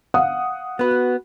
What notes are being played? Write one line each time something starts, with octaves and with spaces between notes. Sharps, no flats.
F5 F#5 D#6
B3 F#4 B4